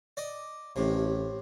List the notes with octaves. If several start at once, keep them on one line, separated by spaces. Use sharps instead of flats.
D5 D#5
A1 A2 C3